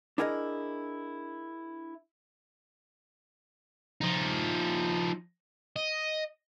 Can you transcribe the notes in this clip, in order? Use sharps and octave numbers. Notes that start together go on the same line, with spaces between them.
D4 E4 G#4 A#4 D5 D#5
F3 D#4
D#5